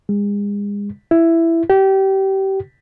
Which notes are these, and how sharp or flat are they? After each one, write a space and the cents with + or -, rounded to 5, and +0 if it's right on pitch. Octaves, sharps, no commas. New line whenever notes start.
G#3 -35
E4 +10
G4 -25